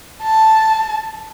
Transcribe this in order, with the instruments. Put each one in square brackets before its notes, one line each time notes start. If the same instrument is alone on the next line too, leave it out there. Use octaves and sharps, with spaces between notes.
[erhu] A5